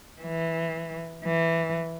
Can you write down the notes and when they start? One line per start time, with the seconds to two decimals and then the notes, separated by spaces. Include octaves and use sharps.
0.22 E3
1.25 E3